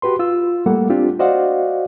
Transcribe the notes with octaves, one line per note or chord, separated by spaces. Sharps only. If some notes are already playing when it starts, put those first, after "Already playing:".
F#4 G4 B4 C6
F4 E6
G3 A3 A#3 A4 F#5
C4 D4 F4 G4
F#4 C5 D5 D#5 F5 F#5